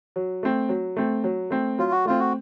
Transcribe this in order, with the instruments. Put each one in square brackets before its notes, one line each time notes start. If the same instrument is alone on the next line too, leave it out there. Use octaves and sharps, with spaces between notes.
[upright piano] F#3
A3 C4
F#3
A3 C4
F#3
A3 C4
[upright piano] F#3 [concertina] F4
[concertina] F#4
[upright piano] A3 C4 [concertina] F4
[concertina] F#4